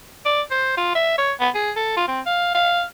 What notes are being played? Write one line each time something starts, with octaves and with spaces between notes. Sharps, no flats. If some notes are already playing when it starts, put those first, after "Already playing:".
D5
C5
F4
E5
C#5
B3
G#4
A4
F4
C4
F5
F5